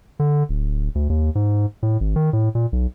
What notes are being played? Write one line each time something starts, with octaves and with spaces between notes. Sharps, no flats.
D3
D1
D2
D#2
G#2
A2
G#1
D#3
A2
A#2
B1